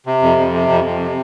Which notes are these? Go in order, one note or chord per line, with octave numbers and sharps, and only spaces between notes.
C3
F2
F2
C3
F2
F2
C3